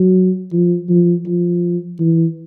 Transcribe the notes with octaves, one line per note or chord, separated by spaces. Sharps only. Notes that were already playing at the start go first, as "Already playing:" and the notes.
Already playing: F#3
F3
F3
F3
E3